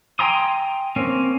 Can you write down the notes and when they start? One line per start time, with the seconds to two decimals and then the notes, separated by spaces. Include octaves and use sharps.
0.19 G5 G#5 A#5 C6 D#6
0.96 A#3 C4 C#4